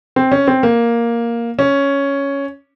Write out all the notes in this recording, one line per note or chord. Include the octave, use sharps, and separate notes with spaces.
C4
C#4
C4
A#3
C#4